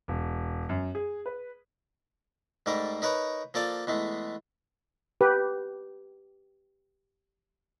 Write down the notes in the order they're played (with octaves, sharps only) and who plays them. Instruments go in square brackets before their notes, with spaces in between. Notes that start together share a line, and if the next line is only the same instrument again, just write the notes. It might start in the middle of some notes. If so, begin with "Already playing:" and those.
[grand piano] E1
F#2
G#4
B4
[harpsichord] G#2 G3 A3 A#4
D#4 A#4 B4 C#5
F3 A#3 A4 D5 F5
E2 G#3 A3
[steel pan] G4 B4